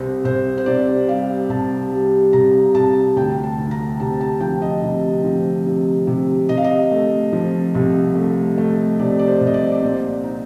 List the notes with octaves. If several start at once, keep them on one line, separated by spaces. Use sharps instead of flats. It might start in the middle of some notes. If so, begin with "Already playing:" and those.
Already playing: C2 C5
C2 C5
C5
C3 D5
G3 F5
C2 A5
G3
C2 A#5
C2 A5
D2 G5
A5
D2
A#5
C3 A5
A5
F3 G5
D#5
C3
F3
C3
C3
C3 D#5
F5
D#5
A3
F3
C2
A3
A3
C3 D5
D5
C5
C2
D#5
D5
D5
A#2 C5
D#4